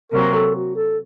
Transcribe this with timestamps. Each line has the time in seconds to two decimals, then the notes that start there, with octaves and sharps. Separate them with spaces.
0.12 C3 F#3 A#3 A#4
0.34 A4
0.55 F#4
0.76 A4